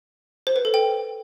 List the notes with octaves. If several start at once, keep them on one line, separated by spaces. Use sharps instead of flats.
C5
B4
A4
G5